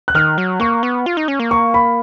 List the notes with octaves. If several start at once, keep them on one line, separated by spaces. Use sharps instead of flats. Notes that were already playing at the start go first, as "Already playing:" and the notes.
F#6
D#3 F6
F#3
A#3 C#6
B3
F4
D#4
C#4
A#3
C#6
B5